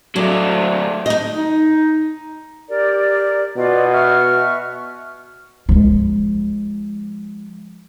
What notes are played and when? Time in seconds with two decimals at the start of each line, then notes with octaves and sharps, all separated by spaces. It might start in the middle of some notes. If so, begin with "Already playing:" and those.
0.16 F#3 A3 D4
1.06 D#4 D#5
1.35 D#4
2.69 G4 A#4 D5
3.56 B2 F4 D5 D#5
3.92 E5 C#6 F6
5.69 F3 G#3